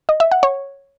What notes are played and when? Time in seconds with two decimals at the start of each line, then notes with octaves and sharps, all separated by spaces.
0.09 D#5
0.20 E5
0.31 F#5
0.43 C#5